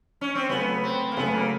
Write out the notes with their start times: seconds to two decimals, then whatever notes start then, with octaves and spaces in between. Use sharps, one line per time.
0.21 C#4
0.35 C4
0.49 C#3 F#3 A3 B3
0.84 C4
1.12 A#3
1.17 C#3 F#3 A3 B3
1.35 A#3